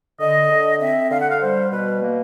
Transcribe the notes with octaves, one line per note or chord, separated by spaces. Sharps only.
D3 D#5
D3
C4 E5
D3 F5
F#5
F5
G3 C5
B2 B4
A#3